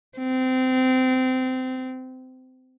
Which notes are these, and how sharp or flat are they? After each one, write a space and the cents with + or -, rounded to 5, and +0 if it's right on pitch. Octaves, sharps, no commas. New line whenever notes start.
C4 -25